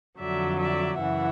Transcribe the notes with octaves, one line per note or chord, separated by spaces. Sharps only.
F2 D3 F#3 D5 E5
D5 E5
F#2 C#3 E3 E5 F#5